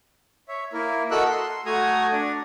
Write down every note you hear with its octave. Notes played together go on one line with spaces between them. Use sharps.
C#5 E5
A#3 E4 A#4
F#4 A4 A#4 D#5 E6 F#6
C6
A3 F#4 G#5 A#5 D#6
D4 D5